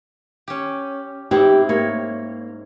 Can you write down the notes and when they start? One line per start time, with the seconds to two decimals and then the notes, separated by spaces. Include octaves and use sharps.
0.48 C#4 G4
1.31 G#2 C4 E4 G4
1.69 A#3 C#5